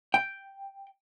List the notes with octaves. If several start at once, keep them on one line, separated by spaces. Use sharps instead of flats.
G5